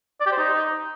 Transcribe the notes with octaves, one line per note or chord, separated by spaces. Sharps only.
D5
G4
C5
D#4